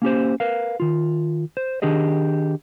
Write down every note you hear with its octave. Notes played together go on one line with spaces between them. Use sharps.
A#3 C#4 G4 C5
A#4 B4 F5
D#3 F4
C5
D#3 D4 G4 G#4 D#5